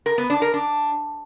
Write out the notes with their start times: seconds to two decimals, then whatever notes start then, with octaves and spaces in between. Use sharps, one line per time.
0.06 A#4
0.18 B3
0.30 D4
0.42 A#4
0.54 D4